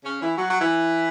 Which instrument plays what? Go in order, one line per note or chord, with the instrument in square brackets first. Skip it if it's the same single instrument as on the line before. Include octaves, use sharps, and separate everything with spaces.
[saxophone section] C#3 C#4
E3 E4
F#3 F#4
F#3 F#4
E3 E4